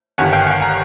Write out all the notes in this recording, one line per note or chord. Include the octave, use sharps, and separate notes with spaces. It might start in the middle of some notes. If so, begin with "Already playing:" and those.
G1 G2 D#3 F#5 G#5
F5 G5
F#5 G#5
G#5 A#5